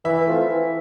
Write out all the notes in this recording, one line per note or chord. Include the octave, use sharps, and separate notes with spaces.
E3 E5
A3 C4 F4
E3